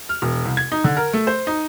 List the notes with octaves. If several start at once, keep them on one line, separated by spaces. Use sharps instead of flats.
F6
E1
C2
G#6
D#4
D3
A#4
A3
C5
D#4